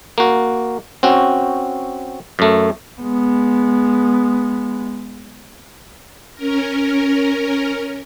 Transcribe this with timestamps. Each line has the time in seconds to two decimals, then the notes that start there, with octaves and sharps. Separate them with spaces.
0.18 A#3 F#4
1.03 C4 C#4 F#4
2.39 F#2 A3
3.01 G#3 B3
6.34 C#4 A#4